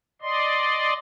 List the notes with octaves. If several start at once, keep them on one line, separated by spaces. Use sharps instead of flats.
D5 D#5 C6